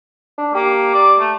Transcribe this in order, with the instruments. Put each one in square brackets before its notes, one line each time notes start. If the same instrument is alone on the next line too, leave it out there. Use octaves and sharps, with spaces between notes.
[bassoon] D4
[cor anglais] A#3 [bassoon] G4
[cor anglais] D5
A3